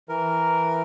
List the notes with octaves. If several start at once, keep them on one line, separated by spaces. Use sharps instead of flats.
E3 A#4